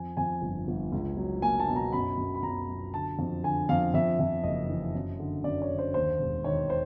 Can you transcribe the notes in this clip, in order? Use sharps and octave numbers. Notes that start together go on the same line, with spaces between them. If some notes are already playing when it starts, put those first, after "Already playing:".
Already playing: F2 G#5
F2 G#5
G1
G1
C#2
F#3
A#3 G#5
A5
B2
A#5
F#2 B5
F#2
B5
F#2 A#5
F#3
D3 A5
F2
D3 G#5
F2 F5
F2 E5
F2
F#1 D#5
E3
F#2
D3
F#2 D5
C#5
D3
C5
D#2 C5
E1
D#3 C#5
C5